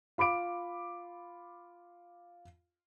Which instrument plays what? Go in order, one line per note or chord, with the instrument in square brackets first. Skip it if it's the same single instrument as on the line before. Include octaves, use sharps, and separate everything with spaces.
[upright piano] F4 B5 D6 D7